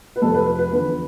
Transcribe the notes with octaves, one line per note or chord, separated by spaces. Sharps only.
B4
F1 F2 C3 A4
B4
B4
B4
E2 D3 F3 B4